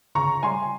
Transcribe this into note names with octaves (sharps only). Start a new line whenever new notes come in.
C#3 A#5 C#6
G3 G#5 C6